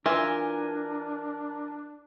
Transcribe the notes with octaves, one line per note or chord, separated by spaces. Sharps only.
E3 D4 F4 A#4 E5 G#5